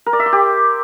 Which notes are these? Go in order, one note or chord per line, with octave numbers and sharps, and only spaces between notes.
A#4
D5
E5
C6
G4